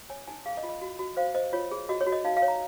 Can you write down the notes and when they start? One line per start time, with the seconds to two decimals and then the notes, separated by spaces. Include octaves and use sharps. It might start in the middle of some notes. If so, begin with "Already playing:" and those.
0.10 C#5 G#5
0.27 D#4 G#5
0.46 G#4 F5
0.57 D#5
0.63 F4
0.69 D#5
0.82 F#4
0.99 F#4
1.17 C5 F5
1.35 C5 D#5
1.53 F4 C#5
1.71 G#4
1.89 F#4 D#5
2.01 C#5
2.07 F#4
2.12 D#5
2.25 D#4 F5
2.37 F5
2.42 C#5
2.48 A#5